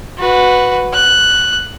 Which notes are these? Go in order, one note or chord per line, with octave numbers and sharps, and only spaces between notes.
F#4 B4
F#6